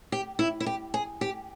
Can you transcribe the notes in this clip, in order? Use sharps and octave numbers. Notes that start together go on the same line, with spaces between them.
G4
E4
E4
G4
G#4
G4